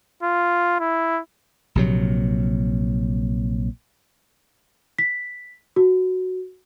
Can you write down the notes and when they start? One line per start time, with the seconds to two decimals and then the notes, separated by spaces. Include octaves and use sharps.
0.23 F4
0.80 E4
1.75 A#1 C3 F#3
4.99 B6
5.76 F#4